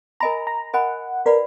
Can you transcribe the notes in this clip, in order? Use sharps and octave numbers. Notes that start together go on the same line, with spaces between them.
A#4 D#5 G#5 A#5 B5
A#5
A#4 D#5 F#5 G#5 B5
F4 A#4 B4 D5 F#5 B5